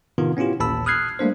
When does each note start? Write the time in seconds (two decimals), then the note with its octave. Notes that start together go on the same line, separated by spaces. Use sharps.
0.18 A2 C3 D#3 B3 F4
0.37 B3 C#4 E4 F4 G4
0.60 A1 D#2 A#2 A5 B5 E6
0.86 D#6 F6 F#6 G#6 C7
1.19 G3 A3 A#3 D4 C5